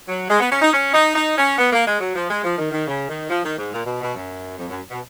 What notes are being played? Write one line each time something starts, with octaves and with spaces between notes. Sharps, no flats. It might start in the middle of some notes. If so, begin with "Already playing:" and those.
F#3
G#3
B3
C#4
D#4
C#4
D#4
D#4
C#4
B3
A#3
G#3
F#3
F3
G#3
F3
D#3
D#3
C#3
D#3
F3
D#3
G#2
A#2
B2
B2
F#2
F2
F#2
B2